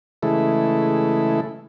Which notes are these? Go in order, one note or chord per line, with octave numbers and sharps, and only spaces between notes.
C#3 E3 G#3 A3 E4 A4